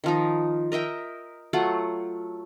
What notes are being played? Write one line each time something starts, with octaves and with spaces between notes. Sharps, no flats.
D#3 F3 D#4
A#4 D#5 E5 G5
F#3 A3 F4 F#5